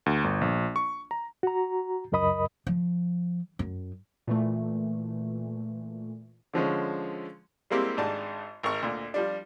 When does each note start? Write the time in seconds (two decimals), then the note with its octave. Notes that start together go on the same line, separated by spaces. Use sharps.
0.06 D2
0.24 G1
0.41 A#1
0.76 C#6
1.11 A#5
1.43 F#4 A#5
2.12 C#2 F#2 A#4 D#5 B5 D#6
2.67 F3
3.59 F#2
4.27 A#2 E3 A3
6.53 D3 F3 G#3 C#4
7.70 G3 G#3 A#3 C4 E4 G4
7.97 G#1 G#2 D4 A5
8.63 G#1 A#4 C#6
8.82 D2 A#2
9.14 F3 G3 D4